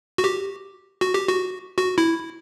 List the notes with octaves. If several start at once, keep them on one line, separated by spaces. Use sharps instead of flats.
F#4
G4
F#4
G4
F#4
F#4
E4